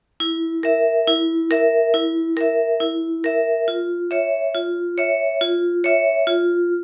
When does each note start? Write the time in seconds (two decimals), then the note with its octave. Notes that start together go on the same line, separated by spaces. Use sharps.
0.20 E4
0.63 A#4 E5
1.07 E4
1.51 A#4 E5
1.94 E4
2.37 A#4 E5
2.80 E4
3.24 A#4 E5
3.68 F4
4.11 C#5 E5
4.55 F4
4.98 C#5 E5
5.41 F4
5.84 C#5 E5
6.27 F4